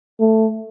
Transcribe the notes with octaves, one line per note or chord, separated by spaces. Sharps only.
A3